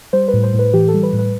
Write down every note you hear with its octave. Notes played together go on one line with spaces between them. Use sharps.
G3 C5
B4
A2
C5
A2
B4
E3 G4
A4
G3
B4
A2
B4